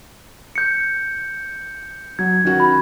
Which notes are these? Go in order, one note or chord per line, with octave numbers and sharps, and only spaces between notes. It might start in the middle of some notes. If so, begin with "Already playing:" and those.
G6 C#7
F#3 G#6
D#3 C#4 F#4
B5